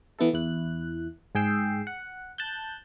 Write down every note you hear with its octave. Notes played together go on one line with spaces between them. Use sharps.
E3 B3 E4 A4
E2 E4 F#6
G#2 G#4 G5 E6 C7
F#5
A5 F#6 G6